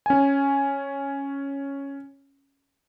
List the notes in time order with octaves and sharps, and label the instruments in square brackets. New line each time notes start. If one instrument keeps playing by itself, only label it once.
[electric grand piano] C#4 G#5